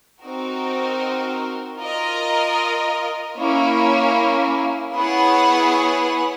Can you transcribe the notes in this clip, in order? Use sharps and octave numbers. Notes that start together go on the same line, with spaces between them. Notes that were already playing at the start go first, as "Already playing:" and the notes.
C4 D#4 F#4 A#4
F4 A#4 D#5
A#3 C#4 E4
B3 E4 G#4 C#5 F#5